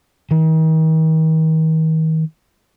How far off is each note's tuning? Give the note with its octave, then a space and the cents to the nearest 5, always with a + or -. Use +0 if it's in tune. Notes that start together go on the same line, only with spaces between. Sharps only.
D#3 +40